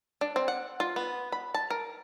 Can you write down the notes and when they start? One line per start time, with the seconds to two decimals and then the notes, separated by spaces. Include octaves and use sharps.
0.21 D4
0.36 C4
0.48 F#5
0.80 F4
0.96 B3
1.32 B5
1.54 A5
1.70 A#4